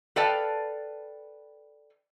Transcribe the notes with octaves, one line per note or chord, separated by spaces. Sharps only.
A4 B4 D5 F5 G5 A5